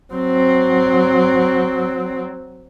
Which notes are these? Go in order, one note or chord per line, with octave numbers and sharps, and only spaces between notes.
F#3 C4